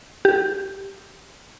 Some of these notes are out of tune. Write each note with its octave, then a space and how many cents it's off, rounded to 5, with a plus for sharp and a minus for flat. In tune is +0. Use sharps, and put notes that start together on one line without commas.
G4 -5